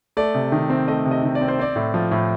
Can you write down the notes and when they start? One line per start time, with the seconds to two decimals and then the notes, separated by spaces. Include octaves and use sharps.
0.17 A3 D5
0.35 C3
0.52 D#3
0.70 C4
0.88 A3 D#5
1.05 C3
1.11 D#5
1.23 D#3
1.35 D5
1.41 C4
1.48 C5
1.59 C4 D5
1.76 A2
1.94 F3
2.11 A2